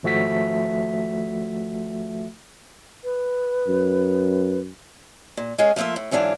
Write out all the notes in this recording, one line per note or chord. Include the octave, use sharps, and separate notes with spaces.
G#1 F3 A3 F#4 E5 B6
B4
F#2
A#2
G#3 C#4 G#4 C#5 F5
F3 A3 A#3 F4 E5
A2
G#2 E3 F#3 D4 F5